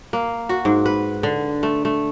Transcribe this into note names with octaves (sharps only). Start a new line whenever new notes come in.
A#3
F#4
G#2
B4
D3
A3
A3